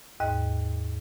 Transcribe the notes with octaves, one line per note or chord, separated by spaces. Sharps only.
D#2 G#2 D#5